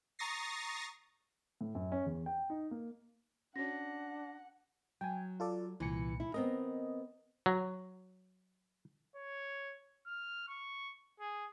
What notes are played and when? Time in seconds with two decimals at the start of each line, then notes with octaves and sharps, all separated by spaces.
0.19 A#5 C#6 D#6 A6 A#6 C7
1.61 A2
1.75 F#2
1.92 C#4
2.06 E2
2.26 G5
2.50 D#4
2.71 A#3
3.56 C#4 D4 F#4 C#5 F#5 A#6
5.01 F#3 G5 G#5
5.40 F4 A4 D5
5.80 C2 A#2 E3 C#7
6.20 E4
6.34 B3 C4 A#4 D#5
7.46 F#3
9.16 C#5
10.07 F6
10.48 C#6
11.20 G#4